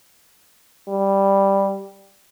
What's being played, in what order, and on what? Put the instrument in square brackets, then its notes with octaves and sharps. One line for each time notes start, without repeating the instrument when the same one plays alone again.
[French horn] G3